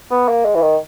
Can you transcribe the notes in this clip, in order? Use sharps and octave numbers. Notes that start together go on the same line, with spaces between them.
B3
A#3
G#3
E3
D#3